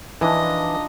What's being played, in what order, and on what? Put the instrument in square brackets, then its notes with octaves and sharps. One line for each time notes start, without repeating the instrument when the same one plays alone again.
[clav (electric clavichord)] E3 [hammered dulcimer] F3 D4 D#4 [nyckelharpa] D#5